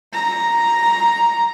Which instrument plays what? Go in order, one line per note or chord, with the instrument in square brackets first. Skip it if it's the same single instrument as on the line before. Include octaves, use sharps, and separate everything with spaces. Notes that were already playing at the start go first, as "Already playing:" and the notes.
[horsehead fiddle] A#5